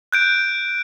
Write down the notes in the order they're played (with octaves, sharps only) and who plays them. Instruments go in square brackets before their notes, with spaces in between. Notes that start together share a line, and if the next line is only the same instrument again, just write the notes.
[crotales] F#6 G6 D7